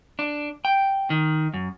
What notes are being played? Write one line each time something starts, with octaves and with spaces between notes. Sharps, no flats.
D4
G5
D#3
F#2